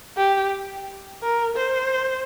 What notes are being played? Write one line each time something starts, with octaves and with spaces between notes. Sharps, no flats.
G4
A#4
C5